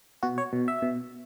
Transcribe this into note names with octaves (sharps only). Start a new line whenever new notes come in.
B2 F#4
C#5
B2
E5
B2